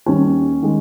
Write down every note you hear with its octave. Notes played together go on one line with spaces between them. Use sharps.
D#2 D#3 G3 C#4
D#3 G#3